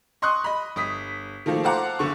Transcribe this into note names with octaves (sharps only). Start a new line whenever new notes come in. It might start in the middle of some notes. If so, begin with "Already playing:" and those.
D#5 C6 C#6 D#6 F#6
D#5 B5
G1 D#6 B6
D#3 F3 A3 A#3
A4 C5 F5 F#5 A#5 D6
F#1 D3 C#6